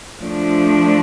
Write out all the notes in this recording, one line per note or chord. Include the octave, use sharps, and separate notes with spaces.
F3 A3 D4